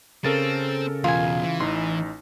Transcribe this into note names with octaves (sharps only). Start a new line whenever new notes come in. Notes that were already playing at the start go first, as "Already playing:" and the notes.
C#3 C4 A4 A#4 A6
E2 B2 F4 G#5
E3
A1 D#4 C6